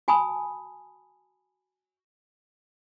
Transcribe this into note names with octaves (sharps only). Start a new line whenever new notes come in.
F#4 G#5 A5 B5 D#6